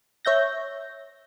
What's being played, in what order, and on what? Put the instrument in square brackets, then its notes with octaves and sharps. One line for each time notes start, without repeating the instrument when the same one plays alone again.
[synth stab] C#5 E5 G6 A#6